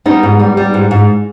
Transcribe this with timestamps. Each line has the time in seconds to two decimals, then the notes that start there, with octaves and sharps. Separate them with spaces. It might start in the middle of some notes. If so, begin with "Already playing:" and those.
0.06 G3 B3 D#4
0.23 G#2
0.40 G3
0.57 G3
0.74 G#2
0.91 G#2